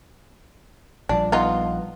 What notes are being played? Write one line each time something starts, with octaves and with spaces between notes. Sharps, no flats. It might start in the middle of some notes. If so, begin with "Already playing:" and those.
A#1 F3 G3 D4
B3 D#4 F4